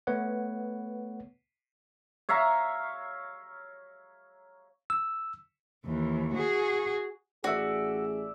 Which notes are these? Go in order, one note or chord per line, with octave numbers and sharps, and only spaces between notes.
A3 B3 B4 C#5 F#5
C#5 E5 F5 A#5
E6
D#2 E3
F#4 G#4
A1 F#4 G#4 D5 E5